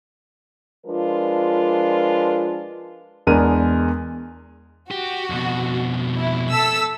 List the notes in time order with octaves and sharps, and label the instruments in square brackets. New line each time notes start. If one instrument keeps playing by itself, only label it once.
[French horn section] F3 G#3 D4 F4 A#4 B4
[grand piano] E2 G#3 D4 A#4 D#7
[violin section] F#4 [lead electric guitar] G4
[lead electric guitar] F2 B2
[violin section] E4
A4 E6 B6